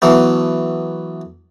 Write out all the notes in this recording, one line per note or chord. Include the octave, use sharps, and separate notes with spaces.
E3 F#3 A3 B3